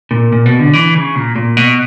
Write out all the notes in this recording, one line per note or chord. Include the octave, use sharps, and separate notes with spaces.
A#2
A#2
B2
D3
E3
C#3
A#2
A#2
B2